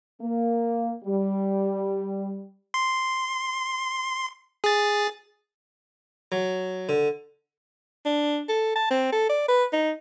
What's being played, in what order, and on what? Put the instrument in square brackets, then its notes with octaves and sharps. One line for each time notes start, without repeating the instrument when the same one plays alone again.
[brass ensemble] A#3
G3
[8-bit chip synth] C6
G#4 A6
[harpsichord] F#3
D3
[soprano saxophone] D4
A4
A5
C4
A4
D5
B4
D#4